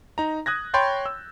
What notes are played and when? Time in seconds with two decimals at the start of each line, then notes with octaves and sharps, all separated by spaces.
0.18 D#4 A#5
0.46 D#6 F#6 G#6 A#6
0.74 C#5 G5 B5 C6 G6 A6
1.06 E6